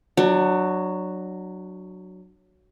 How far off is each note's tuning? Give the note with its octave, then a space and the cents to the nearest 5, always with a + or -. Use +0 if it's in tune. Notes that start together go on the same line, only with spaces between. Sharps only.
F#3 +0 D4 +25